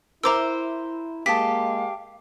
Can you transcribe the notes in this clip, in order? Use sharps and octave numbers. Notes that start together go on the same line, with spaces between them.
E4 A#4 C5 E5 A#5 D6 E6
G#3 A#3 G4 D#5 F5 A5 B6